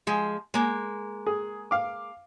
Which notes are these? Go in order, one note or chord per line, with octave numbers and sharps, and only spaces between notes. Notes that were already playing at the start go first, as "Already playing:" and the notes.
F3 G#3
G#3 A#3
G#4
F5 D6